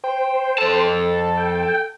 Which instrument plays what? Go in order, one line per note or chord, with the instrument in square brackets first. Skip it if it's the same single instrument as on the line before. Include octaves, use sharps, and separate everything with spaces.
[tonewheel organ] C5 [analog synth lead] G5
[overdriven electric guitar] F2 A5 [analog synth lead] A4
[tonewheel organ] G5